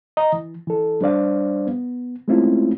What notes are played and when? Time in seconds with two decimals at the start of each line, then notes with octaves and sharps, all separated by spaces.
0.17 D#5 A#5
0.32 E3
0.67 E3 A4
1.01 G3 D4 C5 D5 F5
1.67 B3
2.28 G#3 A3 C4 C#4 E4 F4